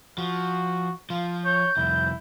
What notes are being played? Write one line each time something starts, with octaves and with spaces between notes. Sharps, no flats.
F3 F#4
F3 F4
C#5 G6
C2 F2 E4